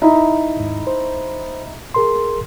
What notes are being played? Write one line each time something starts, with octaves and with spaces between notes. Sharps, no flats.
D#4 E4
D#2 G#2
C5
G#4 A#4 C6